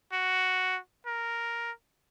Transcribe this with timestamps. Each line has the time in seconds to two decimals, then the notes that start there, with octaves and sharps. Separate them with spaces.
0.13 F#4
1.06 A#4